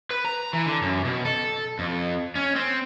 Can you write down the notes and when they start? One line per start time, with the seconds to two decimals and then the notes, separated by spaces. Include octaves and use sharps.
0.11 B4
0.25 A#5
0.53 E3
0.66 D3
0.82 F#2
1.05 B2
1.25 A4
1.79 F2
2.35 C#4
2.56 C4